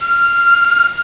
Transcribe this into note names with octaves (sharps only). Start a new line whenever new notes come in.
F6